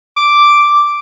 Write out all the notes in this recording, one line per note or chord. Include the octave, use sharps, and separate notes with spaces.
D6